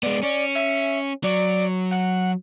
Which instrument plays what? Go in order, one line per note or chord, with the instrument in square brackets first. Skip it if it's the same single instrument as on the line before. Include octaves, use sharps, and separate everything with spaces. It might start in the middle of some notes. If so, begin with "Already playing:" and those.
[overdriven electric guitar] G#3 B3 [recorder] D5
[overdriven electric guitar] C#4 [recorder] D5
[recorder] E5
[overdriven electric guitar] F#3 [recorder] D5
[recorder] F#5